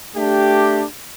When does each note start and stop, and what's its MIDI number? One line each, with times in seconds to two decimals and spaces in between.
0.16 0.83 57
0.16 0.83 62
0.16 0.83 67